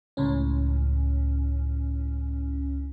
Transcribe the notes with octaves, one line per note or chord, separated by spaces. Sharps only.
C#2 A2 C#4